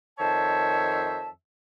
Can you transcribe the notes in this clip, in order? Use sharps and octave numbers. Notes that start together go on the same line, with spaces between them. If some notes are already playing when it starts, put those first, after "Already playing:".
F2 D#3 C5 C#5 E5 A5